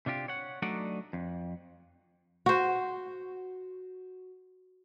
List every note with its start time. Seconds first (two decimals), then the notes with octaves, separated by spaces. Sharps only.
0.06 C3 D4 F4 G4
0.28 C#5 F#5
0.62 F#3 A3 D4 D#4 D5 F#5
1.13 F2
2.46 F#4 C5